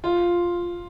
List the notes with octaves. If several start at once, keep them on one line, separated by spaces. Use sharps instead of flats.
F4